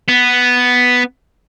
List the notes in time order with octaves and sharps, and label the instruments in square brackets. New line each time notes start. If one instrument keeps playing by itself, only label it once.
[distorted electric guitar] B3